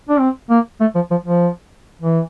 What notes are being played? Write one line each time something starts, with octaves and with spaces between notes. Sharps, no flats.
D4
C4
A#3
A3
F3
F3
F3
E3